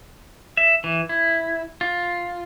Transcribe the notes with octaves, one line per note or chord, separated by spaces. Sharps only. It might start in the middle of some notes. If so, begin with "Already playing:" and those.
E5
E3
E4
F4